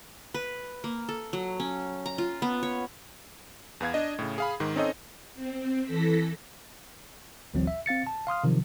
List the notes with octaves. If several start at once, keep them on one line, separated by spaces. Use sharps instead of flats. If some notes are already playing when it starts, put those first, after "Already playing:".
B4
A#3
A4
F#3
C#4
A#5
F4
B3
C#5
E2 B3 F5 G#6
D4 D#5
A2 C#3
G#4 F5 B5
G#2 D#3
C4 C#4 D#4 A4 C#5 D#5
C4
E3 A4 A#6 B6
G1 D2 E3 F#3 C4
E5
C4 F5 A6 C#7
A5
F5 C6 D#6 F6
C3 D#3 F3 F#3